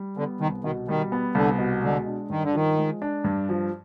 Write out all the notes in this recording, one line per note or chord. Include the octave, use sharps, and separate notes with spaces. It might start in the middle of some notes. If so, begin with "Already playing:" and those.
Already playing: G3
D3 B3
C2 D#3
B2 D#3
D#3 G3
B3
C2 D3
B2
D3 G#3
D4
G2 D#3
D3
D#3 F3
G#3
D4
G2
F3